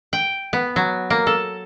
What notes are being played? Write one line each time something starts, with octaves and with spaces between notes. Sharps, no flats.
G5
B3
F#3
A#3
A4